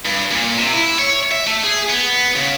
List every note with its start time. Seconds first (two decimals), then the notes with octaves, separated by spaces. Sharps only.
0.05 G2
0.31 A#2
0.57 C3
0.73 E4
0.99 C#5
1.31 E5
1.47 A3
1.63 G#4
1.89 B3
2.36 C#3